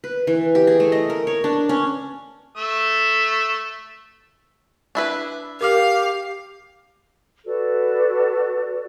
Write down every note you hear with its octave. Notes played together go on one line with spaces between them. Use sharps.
B4
E3
G4
G#4
A3
D#5
A#4
C#5
D4
C#4
A3 E6
D4 E4 B4
G4 A#4 F5 D6 F6
F#4 A4 B4 D5